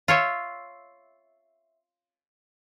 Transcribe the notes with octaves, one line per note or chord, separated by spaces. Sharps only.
F4 C#5 E5